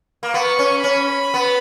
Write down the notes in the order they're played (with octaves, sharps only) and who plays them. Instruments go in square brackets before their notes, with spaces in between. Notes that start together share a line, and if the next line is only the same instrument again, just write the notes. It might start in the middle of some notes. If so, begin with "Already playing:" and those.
[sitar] A#3
[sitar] B3 [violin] C#6
[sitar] C#4
[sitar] C#4 [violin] B5
[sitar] B3